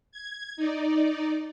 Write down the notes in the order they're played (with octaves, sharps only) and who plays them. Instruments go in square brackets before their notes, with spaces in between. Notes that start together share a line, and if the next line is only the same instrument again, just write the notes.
[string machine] G#6
D#4 D5